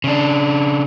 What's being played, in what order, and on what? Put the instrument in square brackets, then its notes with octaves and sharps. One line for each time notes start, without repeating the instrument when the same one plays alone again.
[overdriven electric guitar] C#3 D4